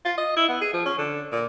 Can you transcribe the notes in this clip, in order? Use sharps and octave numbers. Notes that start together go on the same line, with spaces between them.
F4
D#5
E4
B3
G#4
F3
C#4
D3
A#2